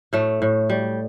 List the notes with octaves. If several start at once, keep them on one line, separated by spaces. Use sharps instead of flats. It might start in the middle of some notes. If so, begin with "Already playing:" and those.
A2 A3
A2
G3